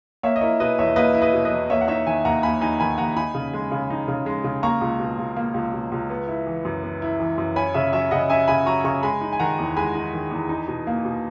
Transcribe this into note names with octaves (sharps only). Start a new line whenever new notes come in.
A#3 C#5 E5
D#5
E4 A#4 C#5
B2 B4 D#5
E2 C#5 E5
A#3 B4 D#5
E4
B4 D#5
B2
B4 D#5
E2
A#3 C#5 E5
F#5
D#4 C#5 E5
D#3 E5 G#5
D#2 F#5 A#5
A#3 G#5 B5
D#4 G#5 B5
D#3 G#5 B5
D#2 F#5 A#5
D#4 G#5 B5
C#3
G#3
C#3
D#4
C#3
G#3
C#3
A#3 A#5 C#6
C#2
B2
C#2
A#3
C#2
B2
C#2
B3
E4
E3
F#2
B3
E4
E3
F#2
C#4 G#5 B5
C#3 C#5 E5
F#3 C#5 E5
C#3 D#5 F#5
C#4 E5 G#5
C#3 G#5 B5
F#3 A#5 C#6
C#3 A#5 C#6
G#3 G#5 B5
D#4
G#5
D#3 F#5 A#5
E2
G#3 G#5 B5
D#4
D#3
E2
D#4
B2
A#3
B2